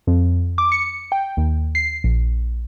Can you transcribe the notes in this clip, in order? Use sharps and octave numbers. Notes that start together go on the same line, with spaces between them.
F2
D6
C#7
G5
D#2
C7
A#1